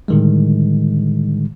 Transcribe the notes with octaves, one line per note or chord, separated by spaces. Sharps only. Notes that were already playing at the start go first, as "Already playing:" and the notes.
A2 D3 D#3 G3 G#3